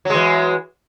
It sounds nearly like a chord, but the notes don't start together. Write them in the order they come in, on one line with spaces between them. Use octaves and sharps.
F#3 G#3 E3